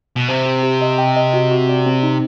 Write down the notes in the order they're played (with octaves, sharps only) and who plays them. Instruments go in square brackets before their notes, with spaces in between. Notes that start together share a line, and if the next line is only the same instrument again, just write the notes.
[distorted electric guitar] B2
[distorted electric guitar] C3 [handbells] C5
[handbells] G4
G4
D#5
G5
D#5
F#4
F#4
D5
C4
D#4